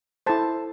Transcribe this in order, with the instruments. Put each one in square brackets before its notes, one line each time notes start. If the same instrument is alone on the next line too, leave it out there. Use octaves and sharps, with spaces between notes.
[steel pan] E4 A4 C5 A5